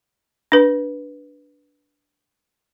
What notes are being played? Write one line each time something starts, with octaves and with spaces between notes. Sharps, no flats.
D4 B4